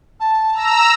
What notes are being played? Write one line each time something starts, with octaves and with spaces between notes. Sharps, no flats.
A5
A#5 E6